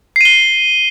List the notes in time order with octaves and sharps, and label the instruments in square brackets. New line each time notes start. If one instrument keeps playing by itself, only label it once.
[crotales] C7
D#7
G7